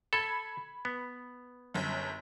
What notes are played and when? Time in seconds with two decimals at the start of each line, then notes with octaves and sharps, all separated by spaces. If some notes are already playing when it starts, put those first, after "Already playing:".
0.13 A4 B5 G#6
0.85 B3
1.74 G1 F#2